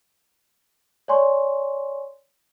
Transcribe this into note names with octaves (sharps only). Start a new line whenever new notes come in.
C#5 D5 G#5 C6 C#6